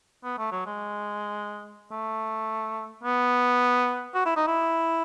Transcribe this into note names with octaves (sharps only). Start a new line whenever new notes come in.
B3
A3
F#3
G#3
A3
B3
F#4
E4
D#4
E4